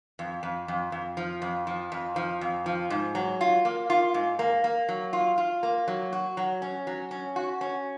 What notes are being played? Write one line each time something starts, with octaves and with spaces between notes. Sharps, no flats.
F2
F2
F2
F2
F3
F2
F3
F2
F3
F2
F3
G#2
F#3
F4
A#3
F4
G#2
A#3
A#3
F#3
F4
F4
A#3
F#3
F#4
F#3
C#4
F#3
C#4
F#4
C#4